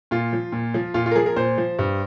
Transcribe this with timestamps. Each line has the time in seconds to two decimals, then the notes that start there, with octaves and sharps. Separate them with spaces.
0.11 A#2 F4
0.33 F3
0.52 A#2
0.74 F3
0.94 A#2 F4
1.06 F4
1.11 A#4
1.15 F3 G#4
1.26 A#4
1.36 A#2 C5
1.58 F3
1.79 G2